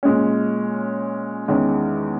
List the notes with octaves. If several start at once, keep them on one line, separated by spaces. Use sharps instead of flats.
A#2 G#3 C#4
E2 D#3 G#3 C#4